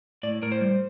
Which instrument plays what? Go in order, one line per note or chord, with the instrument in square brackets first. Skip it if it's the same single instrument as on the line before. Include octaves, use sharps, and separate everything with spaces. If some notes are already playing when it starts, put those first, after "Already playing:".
[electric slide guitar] A2 D5
A2 A#4
C5
G3